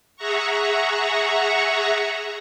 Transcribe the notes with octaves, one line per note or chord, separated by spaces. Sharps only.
G#4 E5 F#5 A#5 C#6